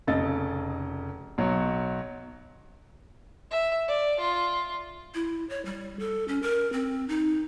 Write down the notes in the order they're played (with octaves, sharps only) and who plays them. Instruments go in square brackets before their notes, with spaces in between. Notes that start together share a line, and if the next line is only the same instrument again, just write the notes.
[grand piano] F1 C#3 A4 D#5 A6
B1 F#3
[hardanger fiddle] E5
D5
F4
[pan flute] E4
C#5
G3
A4
C#4
A#4
C4
D#4